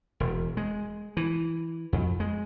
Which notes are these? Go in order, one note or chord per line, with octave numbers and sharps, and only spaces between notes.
E1
G#3
E3
F2
G#3